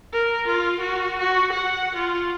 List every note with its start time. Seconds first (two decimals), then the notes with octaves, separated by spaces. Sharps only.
0.13 A#4
0.48 F4
0.81 F#4
1.19 F#4
1.53 F#5
1.96 F4